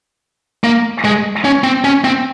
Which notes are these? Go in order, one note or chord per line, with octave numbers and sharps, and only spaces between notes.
A#3
G#3
C#4
C4
C#4
C4